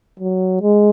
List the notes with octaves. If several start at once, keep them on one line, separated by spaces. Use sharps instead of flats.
F#3
G#3